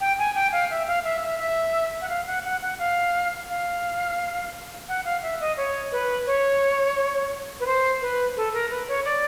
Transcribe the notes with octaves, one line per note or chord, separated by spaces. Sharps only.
G5
G#5
G5
F5
E5
F5
E5
E5
E5
F#5
F5
F#5
F#5
F#5
F5
F5
F#5
F5
E5
D#5
C#5
B4
C#5
B4
C5
B4
A4
A#4
B4
C#5
D5